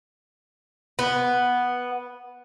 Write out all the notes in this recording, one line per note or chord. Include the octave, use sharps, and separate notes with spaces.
B3